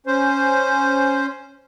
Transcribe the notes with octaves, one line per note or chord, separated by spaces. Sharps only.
C#4 C5